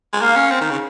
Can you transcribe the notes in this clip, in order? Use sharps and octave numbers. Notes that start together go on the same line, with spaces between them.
G#3
A#3 F5
C#4
C4
D#3
C#3